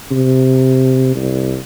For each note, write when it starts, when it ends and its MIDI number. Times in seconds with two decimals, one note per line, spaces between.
0.11 1.12 48
1.15 1.58 36